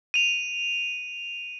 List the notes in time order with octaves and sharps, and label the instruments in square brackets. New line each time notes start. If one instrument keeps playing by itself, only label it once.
[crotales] D#7 F7